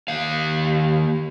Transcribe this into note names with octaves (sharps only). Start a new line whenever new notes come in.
D#2 F5